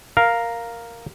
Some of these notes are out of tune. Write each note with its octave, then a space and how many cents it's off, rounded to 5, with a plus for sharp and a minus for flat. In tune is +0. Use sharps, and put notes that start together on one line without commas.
A#4 +0 F5 +0